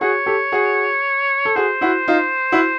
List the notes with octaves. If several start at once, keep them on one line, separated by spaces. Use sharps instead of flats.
F#4 G#4 C#5
G4 A4
F#4 G#4
A4
F#4 G#4 C5
E4 F#4
D#4 F4
E4 F#4